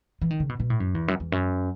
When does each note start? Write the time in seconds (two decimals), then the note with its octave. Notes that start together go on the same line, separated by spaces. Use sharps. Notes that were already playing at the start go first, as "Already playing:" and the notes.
0.21 E3
0.30 D#3
0.40 C#3
0.49 B2
0.60 B2
0.70 A2
0.80 F#2
0.95 E2
1.08 F#2
1.20 E2
1.32 F#2